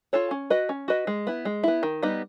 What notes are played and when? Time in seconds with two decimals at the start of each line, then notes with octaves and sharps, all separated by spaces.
0.13 F4 A4 C#5
0.31 C#4
0.50 F#4 B4 D#5
0.69 C#4
0.88 F#4 B4 D#5
1.07 G#3
1.27 B3 E4
1.45 G#3
1.64 B3 E4
1.83 D#3
2.03 G3 B3 D#4